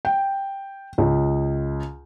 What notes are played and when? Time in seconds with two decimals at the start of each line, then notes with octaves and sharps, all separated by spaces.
0.05 G5
0.98 C#2